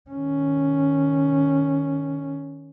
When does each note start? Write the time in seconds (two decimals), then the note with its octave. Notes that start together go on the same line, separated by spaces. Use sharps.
0.10 D#3 C#4